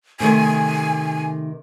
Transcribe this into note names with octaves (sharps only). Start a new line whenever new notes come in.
C3 D#3 A3 G#5